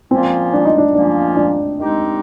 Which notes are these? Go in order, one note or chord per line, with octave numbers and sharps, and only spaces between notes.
A#2 F3 A#3 C4 C#4 F4
D4
D#4
D4
A#2 F3 A#3 C#4 D4 F4
D4
D#3 G#3 C4 D#4 G4